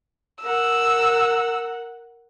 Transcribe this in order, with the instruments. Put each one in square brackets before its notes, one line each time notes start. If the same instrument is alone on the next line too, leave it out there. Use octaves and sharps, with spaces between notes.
[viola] A#4 F#5 [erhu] E6